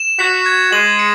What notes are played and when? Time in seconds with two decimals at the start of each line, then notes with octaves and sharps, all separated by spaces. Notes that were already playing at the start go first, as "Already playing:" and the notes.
Already playing: E7
0.19 F#4 B6
0.46 G#6
0.72 G#3 F#7
0.99 C#7